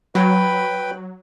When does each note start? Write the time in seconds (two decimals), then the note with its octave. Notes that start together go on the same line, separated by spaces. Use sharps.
0.15 F#3 B4 G5 B5